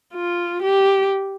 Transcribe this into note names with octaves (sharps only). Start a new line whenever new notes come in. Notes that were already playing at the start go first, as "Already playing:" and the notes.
F4
G4